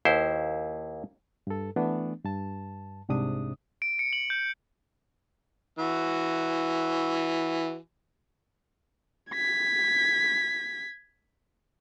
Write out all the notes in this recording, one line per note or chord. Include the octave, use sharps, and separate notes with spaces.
D#2 E4 C5
G2 A4
E3 A3 B3 D4
G2 A5
C2 G#2 C3 D4 D#6
D7
C#7
F#7
G6
E3 F#4
G#6 B6